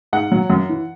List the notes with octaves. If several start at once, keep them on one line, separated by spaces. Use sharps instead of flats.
G#2 F#5
F#3
F#2
E3